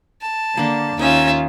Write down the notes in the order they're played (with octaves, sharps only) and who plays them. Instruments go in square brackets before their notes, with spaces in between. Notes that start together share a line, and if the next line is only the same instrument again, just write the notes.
[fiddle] A5
[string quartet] D3 [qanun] A#3 D4
[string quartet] D#2 C#4 F4 [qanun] D#4 [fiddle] E5